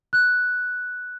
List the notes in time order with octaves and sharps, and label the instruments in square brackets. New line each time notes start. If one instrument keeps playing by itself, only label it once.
[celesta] F#6